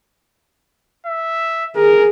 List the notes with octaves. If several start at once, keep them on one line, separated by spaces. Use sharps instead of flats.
E5
G#4 A#4